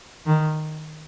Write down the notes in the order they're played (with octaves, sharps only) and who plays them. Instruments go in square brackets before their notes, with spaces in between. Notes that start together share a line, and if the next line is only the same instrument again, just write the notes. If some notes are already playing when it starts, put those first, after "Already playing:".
[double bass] D#3